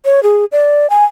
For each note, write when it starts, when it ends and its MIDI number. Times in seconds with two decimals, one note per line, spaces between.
0.05 0.23 73
0.23 0.45 68
0.52 0.89 74
0.90 1.05 80